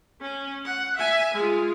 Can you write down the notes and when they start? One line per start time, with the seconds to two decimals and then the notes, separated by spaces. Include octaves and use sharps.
0.22 C#4
0.66 F#5
0.97 E5 G#5
1.35 G#3 F4